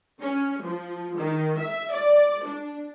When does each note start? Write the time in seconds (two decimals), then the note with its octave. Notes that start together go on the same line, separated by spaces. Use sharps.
0.22 C#4
0.63 F3
1.17 D#3
1.60 E5
1.93 D5
2.45 D4